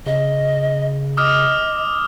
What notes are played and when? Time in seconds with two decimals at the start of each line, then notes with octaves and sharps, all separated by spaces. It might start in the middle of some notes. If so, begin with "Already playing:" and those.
0.06 C#3 D#5
1.17 D#5 D6 D#6 F6